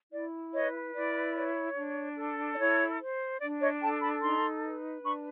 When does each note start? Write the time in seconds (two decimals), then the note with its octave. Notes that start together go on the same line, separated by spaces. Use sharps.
0.12 E4 D5
0.54 B4 C#5 D#5
0.94 E4 D5
1.36 C#5
1.76 D4
2.17 A4
2.53 D5
2.58 E4 C#5
2.99 C5
3.40 D4 D5
3.61 C#5 D#5
3.81 A4 G5 A5
4.01 A5 B5
4.22 D#4 A#5 C6
4.63 B4
5.03 D4 B5 C#6